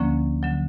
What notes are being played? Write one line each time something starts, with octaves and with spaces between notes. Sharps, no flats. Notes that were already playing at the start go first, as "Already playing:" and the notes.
Already playing: D2 D3 F3 A#3 C#4
D3 F#3